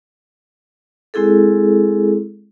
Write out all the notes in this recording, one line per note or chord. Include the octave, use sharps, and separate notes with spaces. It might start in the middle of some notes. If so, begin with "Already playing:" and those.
G#3 C4 E4 G#4 A4